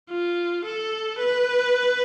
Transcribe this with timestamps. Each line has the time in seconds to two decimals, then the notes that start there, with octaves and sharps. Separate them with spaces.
0.10 F4
0.65 A4
1.18 B4